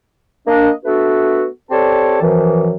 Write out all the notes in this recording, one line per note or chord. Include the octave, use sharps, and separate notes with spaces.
A#3 D4 D#5
A3 B3 D4 F#4 A4 B4
C4 G4 A4 C#5 D5 A5
F#2 E3 F3